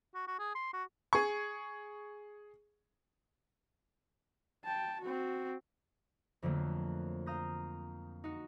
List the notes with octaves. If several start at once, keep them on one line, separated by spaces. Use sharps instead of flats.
F#4
F#4
G#4
C6
F#4
G#4 C#6
G5 A5
C4 F#4
F2 D3 F3 F#3 A3 A#3
F5 A#5 D#6 G6 A#6
D#4 F#4